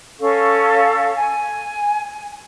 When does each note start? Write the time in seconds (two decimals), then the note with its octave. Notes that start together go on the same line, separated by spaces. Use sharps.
0.20 C#4 A4 F5 C#6
1.14 G#5